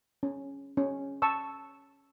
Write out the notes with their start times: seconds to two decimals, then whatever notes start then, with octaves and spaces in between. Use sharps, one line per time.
0.23 C#4
0.77 C#4
1.22 A5 C#6 E6